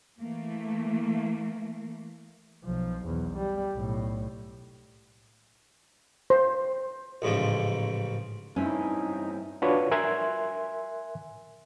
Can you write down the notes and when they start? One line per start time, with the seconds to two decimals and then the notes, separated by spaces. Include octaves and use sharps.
0.19 E3 A3 A#3
2.64 B1 F3
3.05 B1 E2
3.37 G3
3.74 B1 A2
6.30 C5
7.22 A1 G#2 C#3 F3
8.56 G2 C4 C#4 D#4 E4
9.62 D4 F4 F#4 B4 C#5
9.91 A#4 E5 G#5 C6 F#6 G#6